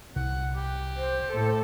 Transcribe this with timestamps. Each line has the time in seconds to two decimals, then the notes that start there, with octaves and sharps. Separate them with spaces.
0.16 C2 F#5
0.56 G4
0.96 C5
1.31 A2 A4